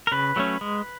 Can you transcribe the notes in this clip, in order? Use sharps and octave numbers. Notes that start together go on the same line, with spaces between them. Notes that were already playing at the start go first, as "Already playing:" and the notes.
A#4
C#3 B4
F#3 A3 C#4
G#3